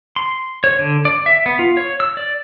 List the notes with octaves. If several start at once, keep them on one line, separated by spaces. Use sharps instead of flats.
C6
C#5
D3
D5
E5
B3
F4
C#5
E6
D5